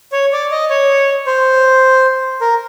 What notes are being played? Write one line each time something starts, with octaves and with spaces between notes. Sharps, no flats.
C#5
D5
D#5
C#5
C5
A#4